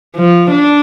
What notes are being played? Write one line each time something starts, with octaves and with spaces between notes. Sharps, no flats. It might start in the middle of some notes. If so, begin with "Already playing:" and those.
F3
D4